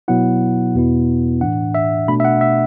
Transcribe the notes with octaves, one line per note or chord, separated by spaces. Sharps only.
B2 F#3 B3 E4 F#5
E2 B2 B3 E4
A2 E3 D4 F#5
E5
B2 A3 D4 B5
E5
F#5
E5